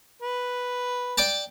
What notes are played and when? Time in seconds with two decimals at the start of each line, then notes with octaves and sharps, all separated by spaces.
0.22 B4
1.18 D5 G5 A5